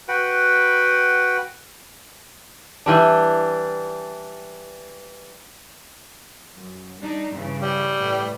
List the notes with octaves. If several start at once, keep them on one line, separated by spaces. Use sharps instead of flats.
F#4 B4 F#5 G5
E3 G3 D4
F#2
G3 D4 D#4
G2 C#3 E3
G3
A2 B4